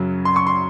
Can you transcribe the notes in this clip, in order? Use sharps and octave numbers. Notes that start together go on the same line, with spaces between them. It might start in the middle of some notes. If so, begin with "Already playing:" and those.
Already playing: F#2 C#3 F#3
C6
C#6
C6